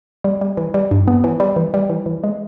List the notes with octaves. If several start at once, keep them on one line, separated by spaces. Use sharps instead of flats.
G3
G3
E3
G3
G2
B3
E3
G3
E3
G3
E3
E3
G#3